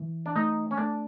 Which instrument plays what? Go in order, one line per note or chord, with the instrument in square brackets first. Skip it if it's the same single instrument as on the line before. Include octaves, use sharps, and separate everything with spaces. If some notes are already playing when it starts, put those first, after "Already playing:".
Already playing: [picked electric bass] E3
[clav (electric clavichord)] D4
[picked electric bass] A3 [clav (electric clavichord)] D#4
[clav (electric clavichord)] C#4
[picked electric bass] A3 [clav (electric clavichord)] D4